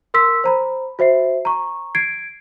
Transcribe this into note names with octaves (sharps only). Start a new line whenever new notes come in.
A#4 C6 E6 B6
C5 A#5 B5
F#4 C5 E5 C7
A#5 C#6
G#6 C7 D7